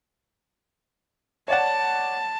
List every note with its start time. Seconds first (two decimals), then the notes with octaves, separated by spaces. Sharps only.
1.48 C#5 D5 F#5 A5